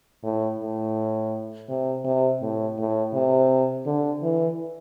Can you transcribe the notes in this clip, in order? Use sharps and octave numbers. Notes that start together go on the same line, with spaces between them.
A2
A2
C3
C3
A2
A2
C3
D3
E3